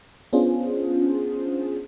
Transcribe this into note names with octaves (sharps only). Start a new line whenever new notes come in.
B3 C#4 D4 F4 G#4 C5